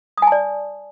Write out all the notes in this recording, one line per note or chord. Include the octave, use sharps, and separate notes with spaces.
D5 G#5 A5 D#6